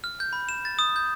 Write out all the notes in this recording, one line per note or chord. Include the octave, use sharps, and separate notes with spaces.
F6
G6
B5
E7
A6
D#6
G6